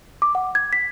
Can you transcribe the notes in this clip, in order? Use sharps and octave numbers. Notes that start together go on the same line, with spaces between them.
D6
F#5
G#6
B6